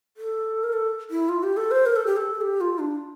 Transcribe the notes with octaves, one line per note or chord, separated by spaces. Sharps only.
A4
A#4
A4
E4
F4
G4
A4
C5
A#4
A4
G4
A4
G4
F4
D4